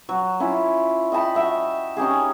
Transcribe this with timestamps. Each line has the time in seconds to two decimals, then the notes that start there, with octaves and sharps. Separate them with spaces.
0.09 F#3
0.40 C#4 E4 F4
1.12 D#5 G5 A5 B5
1.35 F#4 E5 G5
1.55 D6
1.97 C#4 D#4 G4 G#4